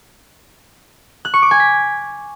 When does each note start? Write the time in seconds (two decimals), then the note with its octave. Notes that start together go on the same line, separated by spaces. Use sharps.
1.25 F#6
1.34 C#6
1.42 D6
1.51 G#5
1.60 B6